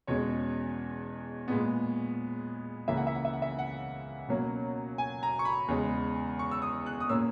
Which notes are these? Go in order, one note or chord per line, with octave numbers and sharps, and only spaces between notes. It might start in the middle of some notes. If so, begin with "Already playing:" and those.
E2 B2 G#3 C#4 C#5
A#2 G#3 B3
C#2 C#3 E3 A#3 E5
F#5
E5
F#5
E5
F#5
E5
F#5
B2 F#3 A#3 C#4
G#5
A#5
C#6
B5
E2 C#3 G#3
C#6
E6
D#6
F#6
D#6
A#2 A#3 C#4 E6